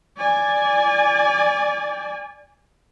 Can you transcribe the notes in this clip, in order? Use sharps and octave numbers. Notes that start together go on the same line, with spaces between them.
D5 G#5